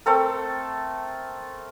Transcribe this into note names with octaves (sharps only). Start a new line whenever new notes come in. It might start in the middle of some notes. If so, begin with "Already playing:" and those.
A3 C4 A4 A#4